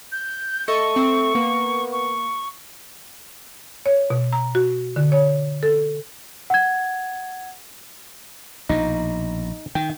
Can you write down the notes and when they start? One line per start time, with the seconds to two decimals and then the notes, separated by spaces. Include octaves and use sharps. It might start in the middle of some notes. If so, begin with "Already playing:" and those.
0.12 G6
0.68 A3 A4 D#5 C#6 C#7
0.96 C4
1.35 A#3 B3
1.92 C#6
3.86 C#5
4.10 B2
4.33 A#5
4.55 F#4
4.96 D3
5.12 C#5
5.63 A4
6.50 F#5 G#6
8.69 A#1 B2 D#4
9.75 D#3 G5